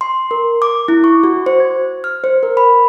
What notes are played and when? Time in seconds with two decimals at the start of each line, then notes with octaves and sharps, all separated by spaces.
0.01 C6
0.31 A#4
0.62 D6
0.88 E4
1.04 C#6
1.24 F#4
1.46 C5
1.60 G#6
2.04 F6
2.24 C5
2.43 A#4
2.57 B5